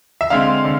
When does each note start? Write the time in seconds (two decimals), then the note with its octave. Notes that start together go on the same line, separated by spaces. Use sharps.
0.21 E5
0.30 D3 G#3 C4 F5
0.64 D3